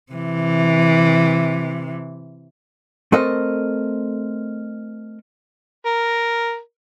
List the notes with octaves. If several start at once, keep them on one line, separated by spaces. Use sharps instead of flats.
C3 E3
A3 C4 A4 A#4 D#5
A#4